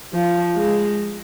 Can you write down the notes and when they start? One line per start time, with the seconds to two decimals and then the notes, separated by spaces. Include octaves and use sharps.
0.14 F3
0.56 G#3